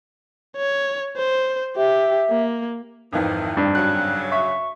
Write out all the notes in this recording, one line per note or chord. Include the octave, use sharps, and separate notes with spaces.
C#5
C5
G4 E5
A#3
G#1 F2 D#3 E3
G2
C#3 F#3 F#6
E5 C#6 B6